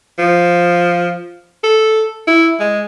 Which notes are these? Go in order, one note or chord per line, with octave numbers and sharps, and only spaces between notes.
F3
A4
E4
G#3